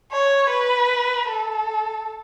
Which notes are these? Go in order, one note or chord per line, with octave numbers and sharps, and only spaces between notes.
C#5
B4
A4